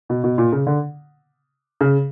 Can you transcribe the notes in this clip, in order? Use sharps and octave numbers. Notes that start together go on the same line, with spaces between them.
B2
B2
A#2
C#3
D3
C#3